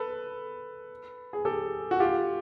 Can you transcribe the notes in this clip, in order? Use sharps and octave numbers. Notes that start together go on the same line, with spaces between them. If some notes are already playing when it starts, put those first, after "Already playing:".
Already playing: A4 B4
G#4
G4 A4
F#4
F4 G4